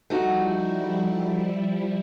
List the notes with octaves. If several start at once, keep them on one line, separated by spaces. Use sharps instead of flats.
F3 G3 A3 D#4 E4 F#4